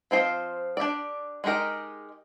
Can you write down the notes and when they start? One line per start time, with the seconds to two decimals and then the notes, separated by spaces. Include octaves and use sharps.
0.11 F3 C4 F4 C5 D#5
0.77 D4 G4 D5
1.44 G#3 D#4 G4 A#4 D#5